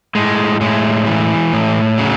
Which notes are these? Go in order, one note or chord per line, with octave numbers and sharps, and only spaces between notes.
A2 G#3
A2 G#3
E3
A2
C#3 F#3